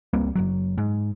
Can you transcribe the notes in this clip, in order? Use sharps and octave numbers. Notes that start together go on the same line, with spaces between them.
C#2 G3 A#3 C4
F#1 C2 F#3
G#2